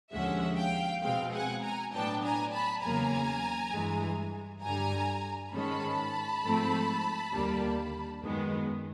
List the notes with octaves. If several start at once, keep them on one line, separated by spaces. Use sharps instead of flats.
D#2 D3 F3 G#3 C#4 E5 F#5
F5 G5
B2 G#3 C4 F5 G5
F#5 G#5
G#5 A#5
A2 F#3 B3 D4 G5 A5
G#5 A#5
A5 B5
E2 C#3 F#3 A#3 G#5 A#5
G2 E3 G#3
G2 D3 G3 G#5 A#5
G#2 D#3 G#3 C#4 A5 B5
G#2 F3 A3 C4
D#2 D3 G3 A#3
F#2 D#3 G#3 B3